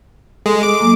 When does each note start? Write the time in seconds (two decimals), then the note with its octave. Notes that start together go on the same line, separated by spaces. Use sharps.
0.46 G#3 A4 D#6
0.63 D6
0.81 F#3 A#3